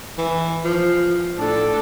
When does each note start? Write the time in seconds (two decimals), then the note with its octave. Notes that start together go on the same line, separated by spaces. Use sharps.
0.18 E3
0.64 F3
1.39 A2 D4 A4